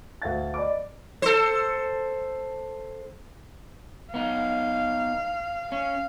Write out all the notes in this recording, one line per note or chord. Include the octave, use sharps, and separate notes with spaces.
D2 F5 A6
D5 D#5 B5 D6
A4 C5
B3 D#4 F5
C#4 F5